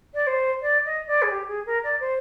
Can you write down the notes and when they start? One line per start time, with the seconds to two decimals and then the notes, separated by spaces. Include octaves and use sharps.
0.14 D5
0.26 C5
0.61 D5
0.85 D#5
1.07 D5
1.22 G#4
1.30 G4
1.48 G#4
1.66 A#4
1.83 D5
2.00 C5